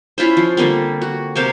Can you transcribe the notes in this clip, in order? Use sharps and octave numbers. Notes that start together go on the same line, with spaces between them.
C#4 E4 F4 C5
F3
D3 G3 A#3 C4
F#4
C3 A#3 C5 F5